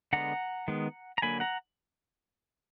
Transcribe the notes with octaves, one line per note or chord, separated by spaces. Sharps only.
D3 G#3 B3 F#5 A#5
D#3 G#3 B3
A#5
D3 F#3 A#3 G#5 B5
F#5 A#5